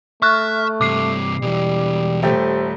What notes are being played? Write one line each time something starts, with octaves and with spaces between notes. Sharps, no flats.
A3 E5 C#6 F6 F#6
G2 C3 D6 C7
B2 E3 G3
D#1 A3 G4 C5